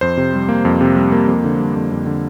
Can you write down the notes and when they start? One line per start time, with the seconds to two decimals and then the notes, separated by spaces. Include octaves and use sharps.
0.01 F2 C5
0.17 C3
0.34 G3
0.49 A#3
0.65 F2
0.81 C3
0.96 G3
1.12 A#3
1.28 F2
1.44 D3
1.59 G3
1.75 F2
1.91 F2
2.06 D3